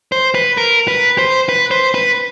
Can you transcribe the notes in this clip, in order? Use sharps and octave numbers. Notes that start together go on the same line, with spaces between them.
C5
B4
A#4
B4
C5
B4
C5
B4